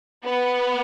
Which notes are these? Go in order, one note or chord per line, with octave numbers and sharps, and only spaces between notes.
B3